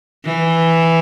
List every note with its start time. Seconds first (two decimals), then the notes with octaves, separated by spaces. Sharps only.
0.25 E3